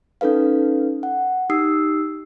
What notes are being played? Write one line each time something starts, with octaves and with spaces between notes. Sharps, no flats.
C#4 D#4 A4 B4 F5
F#5
D#4 G4 D#6 E6 C7